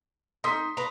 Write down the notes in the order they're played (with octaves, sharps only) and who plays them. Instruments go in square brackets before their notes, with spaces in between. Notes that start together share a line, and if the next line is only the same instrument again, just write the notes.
[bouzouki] D#4 [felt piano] C6 D#6 B6
[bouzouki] B4 A#5